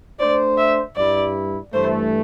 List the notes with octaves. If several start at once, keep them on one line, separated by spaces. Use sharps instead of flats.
A3 D4 C5 D5
E5
G2 G3 E4 D5
G2 E3 A3 C5